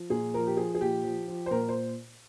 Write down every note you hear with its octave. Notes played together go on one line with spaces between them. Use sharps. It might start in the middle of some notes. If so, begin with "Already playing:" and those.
Already playing: F3
A#2 G#4
F3 A#4
G4
F3 G#4
G#4
A#2 G4
F3
F3
C5
A#2 A#4
C5